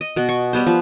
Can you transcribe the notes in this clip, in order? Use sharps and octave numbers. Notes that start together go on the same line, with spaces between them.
D#5
B2 B3
C#6
G3 B3 C5
F3